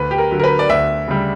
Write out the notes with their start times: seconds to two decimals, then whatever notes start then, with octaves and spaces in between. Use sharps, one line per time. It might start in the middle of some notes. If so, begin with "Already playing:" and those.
Already playing: D2 B4
0.11 G4
0.18 A#4
0.31 D3 F#3
0.40 A#4
0.44 B4
0.59 D5
0.70 D2 E5
1.08 C#3 G3